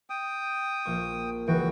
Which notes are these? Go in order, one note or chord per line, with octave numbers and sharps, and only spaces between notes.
G5 D#6
A#1 A#3 C#6
C#2 E3 F#4 G5